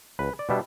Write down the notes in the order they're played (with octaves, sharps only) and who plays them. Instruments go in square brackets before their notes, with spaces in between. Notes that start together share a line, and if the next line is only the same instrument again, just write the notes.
[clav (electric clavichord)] C#2 B4
D5
B2 G3 B3 D4 E5